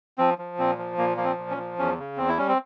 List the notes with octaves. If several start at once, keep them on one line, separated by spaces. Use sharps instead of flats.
F3 C4
F3
A#2 C4
F3
A#2 A#3
F3 A#3
C4
A#2
C#4
F3
E2 C#4
C#3
E2 C4
E4
G3 C#4
C4